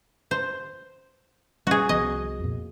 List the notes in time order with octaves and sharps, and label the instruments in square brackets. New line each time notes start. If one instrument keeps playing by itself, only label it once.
[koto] C5
[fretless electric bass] G3 C#4 [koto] F#4 G#4
[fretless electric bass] C2 F3 B3 [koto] D#5
[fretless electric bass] F2 A#2